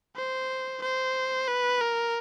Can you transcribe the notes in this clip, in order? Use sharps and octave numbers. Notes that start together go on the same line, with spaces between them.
C5
C5
B4
A#4